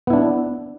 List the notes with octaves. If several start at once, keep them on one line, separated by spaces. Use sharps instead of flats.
B3 D4 E4